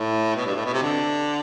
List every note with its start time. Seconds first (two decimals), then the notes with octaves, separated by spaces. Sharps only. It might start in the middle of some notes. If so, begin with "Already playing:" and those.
Already playing: A2
0.36 B2
0.46 G2
0.56 A2
0.65 B2
0.73 C3
0.82 D3